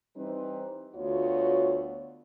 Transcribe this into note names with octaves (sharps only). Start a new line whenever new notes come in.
E3 G3 C4 D#4 B4 C5
D2 B3 F4 F#4 C#5